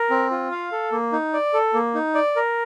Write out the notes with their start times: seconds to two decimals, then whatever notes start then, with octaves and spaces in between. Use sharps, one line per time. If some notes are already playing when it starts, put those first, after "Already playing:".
Already playing: A#4
0.10 C4
0.31 F4
0.51 F5
0.72 A4
0.92 A#3
1.12 D#4
1.33 D5
1.54 A4
1.74 A#3
1.95 D#4
2.15 D5
2.36 A#4